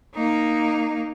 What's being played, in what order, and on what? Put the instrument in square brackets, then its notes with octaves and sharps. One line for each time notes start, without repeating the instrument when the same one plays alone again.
[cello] A#3 D#4